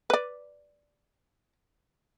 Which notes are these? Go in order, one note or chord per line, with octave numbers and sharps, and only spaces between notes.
B4 D5